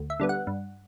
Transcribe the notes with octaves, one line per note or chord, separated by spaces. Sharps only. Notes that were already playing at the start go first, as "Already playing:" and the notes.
Already playing: D2
E5
D3 G3 B3
F#5
G2